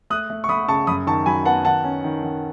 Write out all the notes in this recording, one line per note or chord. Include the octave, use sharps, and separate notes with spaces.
A3 D#6 F#6
A3
C#6
A3 B5 D#6
C#3 A5 C#6
F#2 B5 D#6
D#3 A5 C#6
F#3 G#5 B5
B3 F#5 A5
D#3 F#5 A5
C#4
D#3
D#3